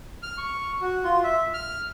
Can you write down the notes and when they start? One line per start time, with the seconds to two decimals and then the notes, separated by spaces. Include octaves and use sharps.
0.23 F6
0.38 C#6
0.81 F#4
1.04 F4
1.23 E5
1.54 F6